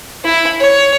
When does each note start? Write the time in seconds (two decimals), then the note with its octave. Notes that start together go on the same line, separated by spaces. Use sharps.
0.25 E4
0.60 C#5